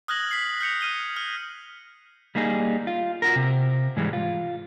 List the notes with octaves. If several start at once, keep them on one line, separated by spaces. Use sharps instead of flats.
D#6 F6 F#6 G#6 A#6 F#7
B6 C7
F6 G6 C#7 F7
F6 D#7 G7
F6 G7
G3 A#3 D#4 G#4
F4
F4 F#4 A#4
C3
G#2 E3 G3 G#3
F4